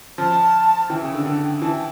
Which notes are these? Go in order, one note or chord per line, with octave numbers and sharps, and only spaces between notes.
F3 A5
E3 G5
C#3
D3
D3
E3 A5
G5